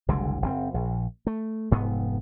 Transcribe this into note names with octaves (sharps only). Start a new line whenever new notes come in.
F#1 C2 D3 G#3
F#1 B2 C4
A#1
A3
F1 G#2 B3